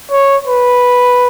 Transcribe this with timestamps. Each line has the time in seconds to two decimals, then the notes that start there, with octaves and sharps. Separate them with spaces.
0.11 C#5
0.47 B4